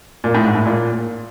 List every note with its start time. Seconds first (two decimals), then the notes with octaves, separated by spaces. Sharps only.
0.24 A#2
0.34 A2
0.45 G#2
0.55 A2
0.66 A#2